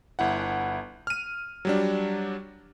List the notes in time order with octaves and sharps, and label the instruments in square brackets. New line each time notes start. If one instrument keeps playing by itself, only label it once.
[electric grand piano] G1 E4 F#5
F6 D#7
F#3 G3 D4